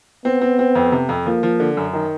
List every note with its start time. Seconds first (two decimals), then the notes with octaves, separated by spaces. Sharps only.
0.25 B3 C4
0.41 C4
0.59 C4
0.75 F2
0.92 C3
1.09 F2
1.26 F3 A#3
1.43 F3
1.60 D3
1.77 F#2
1.93 D#3